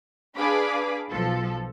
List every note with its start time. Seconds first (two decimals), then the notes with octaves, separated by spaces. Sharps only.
0.35 D4 G#4 B4 F5 B5 D6
1.11 B1 F3 A4